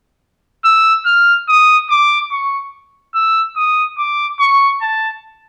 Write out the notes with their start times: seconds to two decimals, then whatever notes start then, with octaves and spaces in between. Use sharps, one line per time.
0.65 E6
1.06 F6
1.48 D#6
1.90 D6
2.31 C#6
3.15 E6
3.56 D#6
3.98 D6
4.39 C#6
4.81 A5